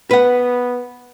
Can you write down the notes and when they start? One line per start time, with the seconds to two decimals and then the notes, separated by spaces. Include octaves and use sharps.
0.11 B3 B4 F#5